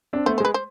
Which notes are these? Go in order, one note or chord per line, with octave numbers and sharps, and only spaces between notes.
C4 D4
A3 B3 C5
G#3 C5
B4
C5